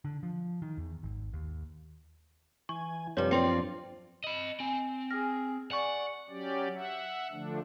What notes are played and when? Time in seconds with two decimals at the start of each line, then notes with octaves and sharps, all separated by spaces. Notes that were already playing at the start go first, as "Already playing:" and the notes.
0.05 D3
0.23 F3
0.62 D#3
0.77 E2
1.03 G#1
1.33 D#2
2.69 E3 G#5 C#6
3.17 F#2 C3 F3 G3 D4 B4 C#5
3.31 C4 F4 D5 G5 C6 C#7
4.24 D#5 B5 F#7
4.60 C4 G#5
5.11 G#4 F6 A#6
5.71 D5 F#5 G#5 C#6
6.29 F#3 C#4 G4 D5
6.75 E5 F#5
7.32 D3 F3 A3 D4